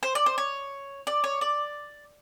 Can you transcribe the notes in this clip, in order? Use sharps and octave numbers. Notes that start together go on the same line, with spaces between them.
C5
D5
C5
C#5
D5
C#5
D5